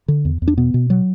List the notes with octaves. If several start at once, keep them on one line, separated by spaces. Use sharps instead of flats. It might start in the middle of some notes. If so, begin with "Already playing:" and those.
D3
E2
E2
D4
B2 B3
B2
F#3